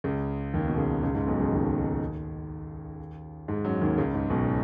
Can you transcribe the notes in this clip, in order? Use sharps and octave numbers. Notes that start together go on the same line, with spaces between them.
C#2 C#3
D#2 D#3
B2
C#2 C#3
C#2 C#3
G#2
B1 B2
C#2 C#3
D#2 D#3
G#2 G#3
F#2 F#3
D#2 D#3
C#2 C#3
G#2
B1 B2